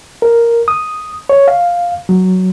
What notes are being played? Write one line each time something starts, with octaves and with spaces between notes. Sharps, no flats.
A#4
D#6
C#5
F5
F#3